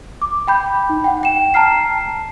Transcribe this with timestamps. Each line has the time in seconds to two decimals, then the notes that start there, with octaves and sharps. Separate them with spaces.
0.22 D6
0.48 G5 B5 G6
0.90 D#4
1.04 F#5 G5
1.23 G5 E7
1.54 A5 A#5 F6 C7